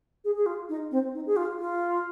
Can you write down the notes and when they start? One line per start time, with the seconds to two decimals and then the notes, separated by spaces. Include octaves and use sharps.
0.24 G#4
0.36 G#4
0.46 F4
0.69 D#4
0.91 C4
1.14 D#4
1.26 G#4
1.36 F4
1.59 F4